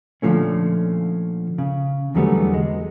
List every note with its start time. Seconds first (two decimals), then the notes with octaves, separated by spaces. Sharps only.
0.22 A#2 D3 D#3 F3 A3 C#4
1.58 C#3
2.15 E2 D3 F#3 G3 A3 B3
2.54 G#3